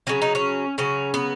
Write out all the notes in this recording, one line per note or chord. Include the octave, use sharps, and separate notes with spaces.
C#3 F#3 C#4
D#4
C#4
C#3 F#3 C#4
B3